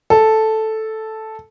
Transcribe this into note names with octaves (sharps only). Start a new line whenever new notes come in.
A4